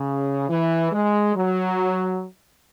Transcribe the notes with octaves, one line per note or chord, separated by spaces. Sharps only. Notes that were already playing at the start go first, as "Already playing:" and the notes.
Already playing: C#3
E3
G#3
F#3